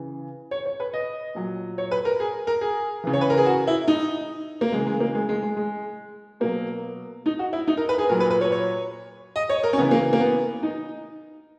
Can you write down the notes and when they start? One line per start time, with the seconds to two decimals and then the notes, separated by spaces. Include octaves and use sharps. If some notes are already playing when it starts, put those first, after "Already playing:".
Already playing: C#3 E3
0.51 C#5
0.65 C#5
0.80 B4
0.94 D#5
1.35 A#2 F#3
1.78 C#5
1.91 B4
2.05 A#4
2.20 G#4
2.47 A#4
2.61 G#4
3.04 C#3 E3
3.13 C#5
3.21 B4
3.30 A#4
3.37 G#4
3.46 F#4
3.67 E4
3.88 D#4
4.61 A#3
4.72 C#3 E3 G#3
4.87 G#3
5.00 A#3
5.15 G#3
5.29 G#3
5.42 G#3
5.57 G#3
6.40 B2 F#3 A#3
7.26 D#4
7.39 F#4
7.53 E4
7.67 D#4
7.77 A#4
7.89 B4
7.98 G#4
8.09 A#2 F#3 A#4
8.20 B4
8.30 B4
8.41 C#5
8.52 C#5
9.36 D#5
9.49 C#5
9.63 A#4
9.73 C#4
9.78 C#3 B3
9.81 E3
9.91 A#3
10.13 A#3
10.20 B3
10.63 D#4